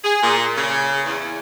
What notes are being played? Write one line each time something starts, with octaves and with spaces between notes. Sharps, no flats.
G#4
A#2
C#3
E2